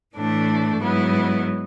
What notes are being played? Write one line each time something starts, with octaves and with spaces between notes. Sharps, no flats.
A2 E3 A3 D4
G#2 F#3 B3 E4